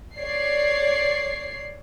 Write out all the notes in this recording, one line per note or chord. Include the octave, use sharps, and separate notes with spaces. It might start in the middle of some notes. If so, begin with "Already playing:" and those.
C#5 D5 C7